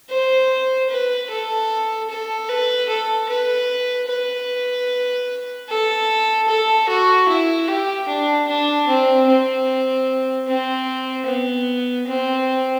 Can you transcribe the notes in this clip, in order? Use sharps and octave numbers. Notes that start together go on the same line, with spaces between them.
C5
B4
A4
A4
B4
A4
B4
B4
A4
A4
F#4
E4
G4
D4
D4
C4
C4
C4
B3
C4